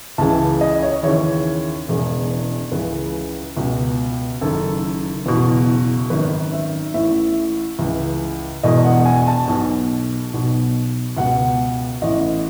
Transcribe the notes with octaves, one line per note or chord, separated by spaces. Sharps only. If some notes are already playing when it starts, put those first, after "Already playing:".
C#2 C#3 E3 A5
D#5
C#5
D#2 C#3 E3 C#5
E1 E2 C#3 E3
C#2 C#3 E3 B4
C#2 B2
F#1 F#2 D#3 A4
F#1 E2 B2
G#1 F#2 D#3 B4
E5
A1 A2 E3 E5
C#2 C#3 E3
E1 E2 B2 D#5
F#5
G#5
A5
B1 B2
B1 B2
C#2 B2 F#5
A1 A2 E3 D#5